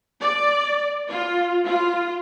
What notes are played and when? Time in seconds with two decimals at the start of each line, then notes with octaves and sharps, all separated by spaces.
0.20 D5
1.10 F4
1.66 F4